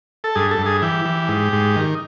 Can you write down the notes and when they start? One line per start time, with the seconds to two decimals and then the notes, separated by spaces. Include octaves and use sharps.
0.24 A4
0.35 G2 G#4
0.51 A4
0.58 G2
0.66 G#4
0.82 E3 G4
1.05 E3
1.28 G#2
1.53 G#2
1.76 D#3